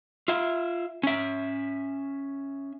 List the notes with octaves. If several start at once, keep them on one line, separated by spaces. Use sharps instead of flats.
F4 E5
C#4 E5